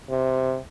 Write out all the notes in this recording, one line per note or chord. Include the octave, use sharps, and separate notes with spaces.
C3